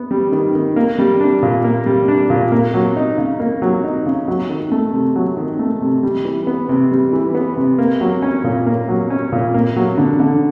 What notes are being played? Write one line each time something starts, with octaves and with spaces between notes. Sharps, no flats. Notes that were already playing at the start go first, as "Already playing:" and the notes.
Already playing: B3
G3
D#3
D#3
A#3
G3
D4
A#2
A#3
G3
D4
A#2
A#3
F#3
D#4
C#3
A#3
F#3
D#4
C#3
F#3
D#3
A3
C3
F#3
D#3
A3
C3
G3
E3
B3
C3
G3
E3
B3
C3
A#3
F#3
C#4
A#2
A#3
F#3
C#4
A#2
A#3
F#3
D3
D3